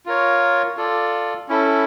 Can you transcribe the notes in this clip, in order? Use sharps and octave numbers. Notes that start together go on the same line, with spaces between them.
F4 A#4 C#5
F4 A4 D5
C#4 E4 A4